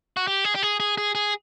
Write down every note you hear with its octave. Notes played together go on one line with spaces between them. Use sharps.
F#4
G4
G#4
G4
G#4
G#4
G#4
G#4